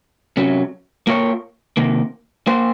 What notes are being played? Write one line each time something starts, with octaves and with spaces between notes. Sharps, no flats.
C3 F#3 C#4
A#3 F4 A#4 C#5
C3 D#3 A#3
A#3 F4 C5